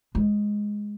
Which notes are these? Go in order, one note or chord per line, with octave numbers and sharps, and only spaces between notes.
G#3